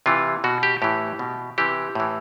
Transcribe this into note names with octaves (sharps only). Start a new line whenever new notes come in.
C3 E3 F4
B2 F#4
G4
A2 E3 G4
B2
C3 E3 G4
A2 E3